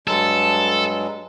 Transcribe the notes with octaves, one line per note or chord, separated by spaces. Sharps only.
G2 F#3 G#3 A4